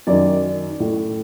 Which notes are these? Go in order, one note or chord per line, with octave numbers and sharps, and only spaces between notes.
F#2 D#3 D5
A2